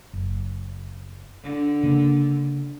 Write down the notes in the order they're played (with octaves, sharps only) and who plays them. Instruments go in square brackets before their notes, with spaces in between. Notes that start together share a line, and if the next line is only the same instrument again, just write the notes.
[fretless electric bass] F#1
[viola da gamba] D3
[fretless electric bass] C#3 A#3